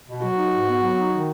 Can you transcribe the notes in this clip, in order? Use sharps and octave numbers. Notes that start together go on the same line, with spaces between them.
B2
F#3 F#4
D#4
G#2
B3
F#3
D#4
D#3